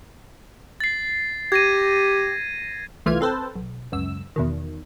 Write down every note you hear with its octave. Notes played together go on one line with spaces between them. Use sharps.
A6 C7
G4 G#6 A#6 D#7
C2 E3 A3 F4 F6 G#6
C4 A4 B4 C5 A5
B1
C#2 F#2 E6
E2 B2 D#3